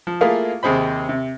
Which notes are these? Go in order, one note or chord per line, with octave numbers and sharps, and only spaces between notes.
F3
A3 A#3 E4 F4 G#4 F5
D#2 C3 G#4 C5 B5
C3